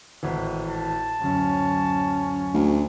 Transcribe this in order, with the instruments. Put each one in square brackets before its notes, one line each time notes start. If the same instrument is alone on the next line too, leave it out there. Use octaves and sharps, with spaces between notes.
[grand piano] G#1 A2 E3
[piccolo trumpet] A5
[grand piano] D1 F#2 [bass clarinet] C#4
[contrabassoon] D2